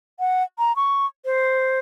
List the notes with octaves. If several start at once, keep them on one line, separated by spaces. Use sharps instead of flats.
F#5
A#5
C#6
C5